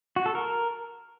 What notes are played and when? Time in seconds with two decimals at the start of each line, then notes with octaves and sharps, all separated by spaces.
0.16 F#4
0.26 A4
0.35 A#4